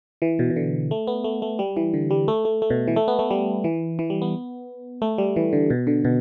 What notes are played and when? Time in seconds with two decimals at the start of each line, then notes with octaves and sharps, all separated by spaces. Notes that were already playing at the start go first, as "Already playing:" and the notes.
0.22 E3
0.39 B2
0.50 B2
0.56 D3
0.91 A3
1.07 B3
1.24 A3
1.42 A3
1.59 G3
1.77 E3
1.94 D3
2.11 G3
2.28 A3
2.45 A3
2.62 A3
2.70 B2
2.88 E3
2.96 A3
3.08 B3
3.19 A3
3.30 G3
3.64 E3
3.99 E3
4.10 G3
4.22 B3
5.02 A3
5.18 G3
5.36 E3
5.53 D3
5.70 B2
5.87 D3
6.05 B2